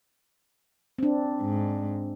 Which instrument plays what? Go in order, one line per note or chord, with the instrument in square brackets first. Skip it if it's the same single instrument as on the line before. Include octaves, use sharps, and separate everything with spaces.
[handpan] C4 D4
[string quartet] G#2